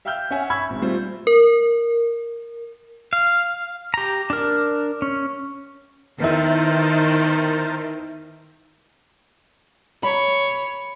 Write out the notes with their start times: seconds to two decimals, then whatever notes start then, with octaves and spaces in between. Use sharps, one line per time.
0.05 E5 F5 G5 E6 F6 G6
0.31 C#4 C#5 E5 F#5 G#5
0.50 B5 C#6 E6 G#6
0.70 G#1 G#2
0.82 G3 A3 C4 F4 C5
1.27 A#4
3.13 F5
3.94 G4 A#5
4.30 D4 A#4
5.02 C#4
6.20 D#3 B3 E4 A#4 C5 A5
10.03 C#5 B5